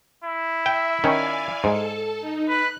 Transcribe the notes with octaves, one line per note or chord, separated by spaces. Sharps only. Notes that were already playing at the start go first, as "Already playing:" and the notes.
E4
E5 G5
D#3 C#4 D5 F5 G#5
G#2 A4 A5
D#4
B4 F#6